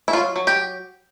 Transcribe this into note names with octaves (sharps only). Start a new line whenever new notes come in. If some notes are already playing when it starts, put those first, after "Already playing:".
E4
F#3 F4
F#3
G4